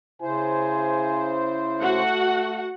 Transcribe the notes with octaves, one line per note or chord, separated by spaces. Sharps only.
C#3 E4 C5 G#5
A3 F#4 F#5